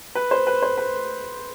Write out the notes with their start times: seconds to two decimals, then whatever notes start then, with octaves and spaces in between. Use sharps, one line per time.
0.15 B4
0.31 C5
0.47 B4
0.62 C5
0.77 B4